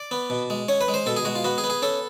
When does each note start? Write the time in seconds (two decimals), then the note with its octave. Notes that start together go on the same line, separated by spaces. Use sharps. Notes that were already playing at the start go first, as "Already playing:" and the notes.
Already playing: D5
0.11 B3
0.30 B2
0.50 G#3
0.68 C#4 C#5
0.81 B4
0.88 G#3
0.94 C5
1.06 B2 A4
1.16 G#4
1.25 G#3 F#4
1.35 F4
1.44 B3 F#4
1.58 G#4
1.64 B3
1.70 G#4
1.82 C#4 A4